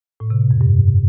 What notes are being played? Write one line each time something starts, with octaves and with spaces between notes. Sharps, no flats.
A2
C3
B2
F2
G2